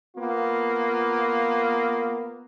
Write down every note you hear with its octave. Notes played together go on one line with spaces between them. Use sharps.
A#3 B3 F4